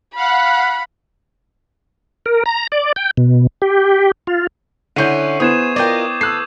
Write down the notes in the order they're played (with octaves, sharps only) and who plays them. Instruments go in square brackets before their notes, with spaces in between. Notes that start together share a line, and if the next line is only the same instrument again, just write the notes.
[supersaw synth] F5 F#5 F#6 [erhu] B5
[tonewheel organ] A#4
A#5
D5
G5
B2
G4
F4
[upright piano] D3 F#5 G6 [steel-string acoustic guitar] C#4 E4 [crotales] C#6 C7 D#7
[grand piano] B3 E4 C5 [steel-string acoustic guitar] G#4 [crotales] D#6 G#6 E7
[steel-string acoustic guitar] F4 A#4 D#5 [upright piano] D5 G5 [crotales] D6 G6
[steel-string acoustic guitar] A4 [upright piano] E6 F#6 C7